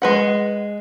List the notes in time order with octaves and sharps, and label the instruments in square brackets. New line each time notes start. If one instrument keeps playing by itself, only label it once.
[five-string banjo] G#3 B4 F#5